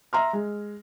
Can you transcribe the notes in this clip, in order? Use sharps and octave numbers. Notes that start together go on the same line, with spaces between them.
E5 A#5 C6 F6
G#3